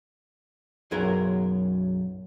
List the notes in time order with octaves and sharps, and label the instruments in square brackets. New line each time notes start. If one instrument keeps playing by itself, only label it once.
[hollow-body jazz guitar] B1 F#2 F#3 G#4 A#4